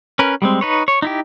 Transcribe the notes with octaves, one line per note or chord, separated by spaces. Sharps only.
C#4 A#4 B4
G3 G#3 C4
D#4 B4 C#5
C#5
D#4 E4 G4